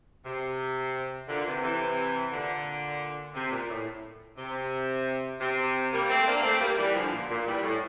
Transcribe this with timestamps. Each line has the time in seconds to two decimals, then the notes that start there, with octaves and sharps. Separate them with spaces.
0.25 C3
1.28 A#2 D3
1.46 C3 E3
1.63 C3 E3
2.32 A#2 D3
3.34 C3
3.51 A#2
3.69 A2
4.37 C3
5.40 C3
5.92 G3 A#3
6.09 A3 C4
6.26 A#3 D4
6.43 A3 C4
6.60 G3 A#3
6.77 E3 G3
6.95 D3 F3
7.13 A#2
7.29 A#2
7.46 E3 G3
7.63 A2